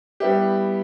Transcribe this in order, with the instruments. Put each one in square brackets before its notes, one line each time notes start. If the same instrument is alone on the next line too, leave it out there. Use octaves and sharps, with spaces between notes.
[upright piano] G3 B3 E4 G4